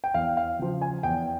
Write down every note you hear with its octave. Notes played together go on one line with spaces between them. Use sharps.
G5
E2 F5
F5
C#3 F3
G#5
E2 G5